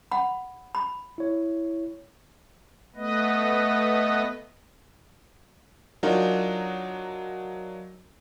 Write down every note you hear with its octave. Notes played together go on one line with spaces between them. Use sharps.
F#5 B5
B5
E4 C#5
A3 B3 B4 D#5
F#3 D4 D#4 F4 F#4 A#4